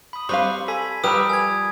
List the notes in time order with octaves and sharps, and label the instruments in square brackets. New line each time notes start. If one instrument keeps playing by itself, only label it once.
[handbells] B5 D#6
[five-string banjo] G3 C4 F5 [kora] B4 C5 [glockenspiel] B5 [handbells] C#6
[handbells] A4 G#5 [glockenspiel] B6
[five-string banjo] F3 A#4 B4 [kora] G3 [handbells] G5 E6 [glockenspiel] D#6
[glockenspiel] G#5 G#6